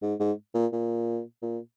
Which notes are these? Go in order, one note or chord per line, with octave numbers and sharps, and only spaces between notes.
G#2
G#2
A#2
A#2
A#2